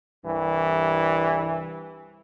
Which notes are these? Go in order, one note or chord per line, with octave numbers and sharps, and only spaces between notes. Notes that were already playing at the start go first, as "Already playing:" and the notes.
C2 G2 E3